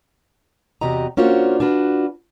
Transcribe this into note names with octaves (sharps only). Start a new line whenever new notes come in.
E2 C3 F#4 G4 D#5 A#5
A#3 C#4 D4 F4 F#4 C5
D4 F4 F#4 B4